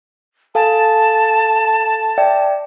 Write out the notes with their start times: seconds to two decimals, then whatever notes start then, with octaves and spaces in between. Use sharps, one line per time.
0.55 A4 F5 G#5 A5
2.18 D5 E5 G5